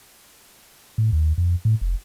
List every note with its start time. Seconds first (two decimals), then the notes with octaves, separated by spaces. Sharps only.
0.98 A2
1.12 D#2
1.38 F2
1.65 A2
1.81 F1